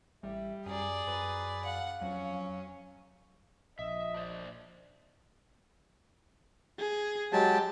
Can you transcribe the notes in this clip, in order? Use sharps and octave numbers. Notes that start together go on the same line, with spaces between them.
A1 G3 E5
F#2 G#4 D5 A#5
F#2 B4
F5 F#5
F2 F#3 C#4
A#1 D#5 E5
D4 C5 D5
G#4
F#3 G#3 G4 A5